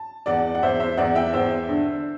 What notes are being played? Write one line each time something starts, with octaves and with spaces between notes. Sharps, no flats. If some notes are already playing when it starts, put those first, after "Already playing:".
Already playing: A5
E2 D5 F#5
F#5
E2 C5 E5
C5 E5
E2 D5 F#5
E5 G5
E2 C5 E5
D3